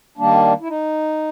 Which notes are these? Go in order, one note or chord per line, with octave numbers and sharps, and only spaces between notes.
D#3 G3 A#3 D4
E4
D#4